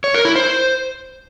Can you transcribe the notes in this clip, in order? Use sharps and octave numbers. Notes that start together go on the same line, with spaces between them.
C#5
A#4
E4
C5